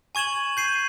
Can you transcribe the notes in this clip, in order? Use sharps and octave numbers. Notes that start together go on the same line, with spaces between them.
G#5 C#6 G#6 E7 F#7
G6 C7 D#7